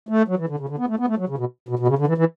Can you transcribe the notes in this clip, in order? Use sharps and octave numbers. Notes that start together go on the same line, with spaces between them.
A3
F#3
E3
D3
C#3
D3
B3
A3
B3
A3
F#3
C#3
B2
B2
B2
C#3
D3
E3
E3